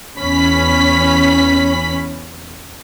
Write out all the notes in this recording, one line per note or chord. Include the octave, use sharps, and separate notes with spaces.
E2 C#4 B5 B6